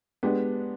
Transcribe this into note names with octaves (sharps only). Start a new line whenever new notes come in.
G#3 B3 D4 G4